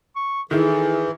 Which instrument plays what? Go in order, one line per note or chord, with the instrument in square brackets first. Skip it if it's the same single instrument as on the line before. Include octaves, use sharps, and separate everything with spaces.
[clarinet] C#6
[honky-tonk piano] D#3 E4 [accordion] E3 [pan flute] G#4 [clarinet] A4